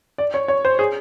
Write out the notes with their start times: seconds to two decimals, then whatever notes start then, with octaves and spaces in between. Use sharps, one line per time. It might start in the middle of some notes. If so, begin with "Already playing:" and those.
0.18 D5
0.34 C#5
0.48 C#5
0.65 C5
0.79 G#4